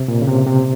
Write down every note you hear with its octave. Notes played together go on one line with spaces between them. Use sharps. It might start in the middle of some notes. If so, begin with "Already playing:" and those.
Already playing: C3
A#2
C#3
C3
C3